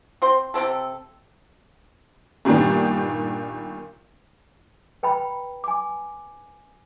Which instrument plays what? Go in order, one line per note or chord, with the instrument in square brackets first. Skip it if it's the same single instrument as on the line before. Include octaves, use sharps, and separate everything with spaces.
[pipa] C4 C5 C6
C3 F3 C4 A4
[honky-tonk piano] G2 A#2 D#3 G3 B3 D4
[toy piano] B4 G5 A#5 B5
G#5 D6